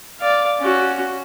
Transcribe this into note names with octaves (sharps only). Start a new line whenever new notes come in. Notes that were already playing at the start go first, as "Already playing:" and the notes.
D5 F5
C#4 F#4